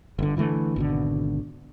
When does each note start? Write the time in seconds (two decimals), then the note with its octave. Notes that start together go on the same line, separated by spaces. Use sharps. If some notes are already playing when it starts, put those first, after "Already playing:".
0.19 G1 D3
0.37 D3 E3 F3 A3
0.76 G#1 B2 D3